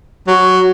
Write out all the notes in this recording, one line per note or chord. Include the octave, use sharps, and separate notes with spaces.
F#3